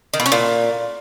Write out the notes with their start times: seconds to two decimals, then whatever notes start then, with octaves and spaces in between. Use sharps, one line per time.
0.14 D#3
0.20 B2
0.26 C#4
0.32 A#2